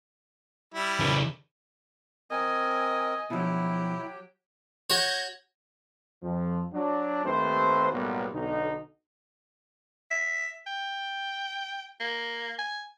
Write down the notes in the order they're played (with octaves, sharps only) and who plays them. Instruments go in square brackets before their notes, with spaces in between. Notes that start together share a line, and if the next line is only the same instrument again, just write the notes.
[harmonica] G3 E4
[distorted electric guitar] C#3 E3
[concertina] C4 A#4 [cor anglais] D#5 [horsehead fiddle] G#5
[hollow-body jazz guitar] B2 F3 [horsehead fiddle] F#3 G4 [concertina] E4
[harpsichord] F#4 C#5 [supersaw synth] G6 G#6 A#6
[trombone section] F2 F3
F#3 D4
D#2 A3 C4 B4 C5
B1 A2 F#3 G3 A#3 B3
B1 D3 D#4
[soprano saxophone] E5
G5
A#3
G#5